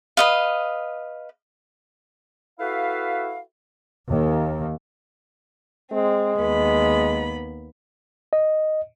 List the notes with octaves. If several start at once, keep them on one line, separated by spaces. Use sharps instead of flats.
B4 D#5 F5
E4 F#4 A4 B4 E5 F5
D#2
G#3 C4
D#2 B3 B5
D#5